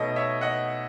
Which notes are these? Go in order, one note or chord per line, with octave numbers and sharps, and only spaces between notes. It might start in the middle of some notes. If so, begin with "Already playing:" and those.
Already playing: B2 A3 D#4 C#5 D#5
C#5 E5
D#5 F#5